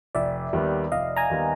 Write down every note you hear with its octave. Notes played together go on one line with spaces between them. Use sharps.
F1 D5 E5
D#2 D#3 G3 B3
F1 D#5 F5
G#5 A#5
D#2 D#3 G3 B3